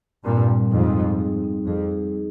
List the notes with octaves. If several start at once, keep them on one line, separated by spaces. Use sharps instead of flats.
G2 A#2 C4
G3
F2 G#2 D#4
C4
G#4
C4
F2 G#4
G#4
D#4